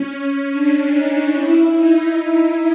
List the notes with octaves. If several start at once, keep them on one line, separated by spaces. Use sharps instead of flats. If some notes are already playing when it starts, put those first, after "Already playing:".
Already playing: C#4
D4
D#4
E4
D#4
D#4